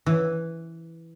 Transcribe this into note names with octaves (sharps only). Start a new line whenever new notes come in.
E3